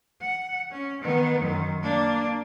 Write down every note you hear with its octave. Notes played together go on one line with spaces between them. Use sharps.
F#5
C#4
D#3 B3
F#2 D#3
A#3 D4